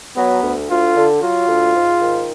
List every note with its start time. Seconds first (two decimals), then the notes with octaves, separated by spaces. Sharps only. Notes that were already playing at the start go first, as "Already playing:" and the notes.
0.16 F#3 B3
0.42 D2
0.70 D2 F4
0.96 D3
1.22 F#3 F4
1.48 D2
1.75 G#2
2.01 D#3